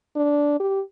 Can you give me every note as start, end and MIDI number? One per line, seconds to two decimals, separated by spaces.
0.16 0.58 62
0.60 0.80 67